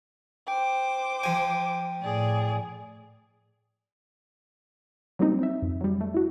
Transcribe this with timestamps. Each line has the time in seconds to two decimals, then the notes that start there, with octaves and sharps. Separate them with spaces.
0.48 C5 G5 D6
1.23 F3 G5 G#5
2.03 A2 G#4 D5
5.19 F#3 G3 A#3 C4 D#4
5.39 C4 E5
5.62 F2
5.81 F#3 G3
6.01 A3
6.14 E4 F#4